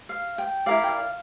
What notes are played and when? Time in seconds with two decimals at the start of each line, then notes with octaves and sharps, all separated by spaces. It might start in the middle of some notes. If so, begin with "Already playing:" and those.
0.09 F5
0.38 G5
0.66 E4 A#4 D5 F5
0.83 G5
0.88 F5